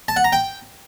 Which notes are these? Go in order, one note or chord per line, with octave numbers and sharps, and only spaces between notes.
A5
F#5
A#5
G5